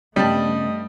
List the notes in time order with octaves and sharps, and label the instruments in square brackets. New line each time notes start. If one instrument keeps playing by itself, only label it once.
[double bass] G2 A3 [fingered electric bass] C#3 B3 C#4 [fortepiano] G3 A5 [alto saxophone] D#5